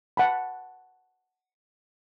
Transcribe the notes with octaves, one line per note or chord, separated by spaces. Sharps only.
F#5 A5 B5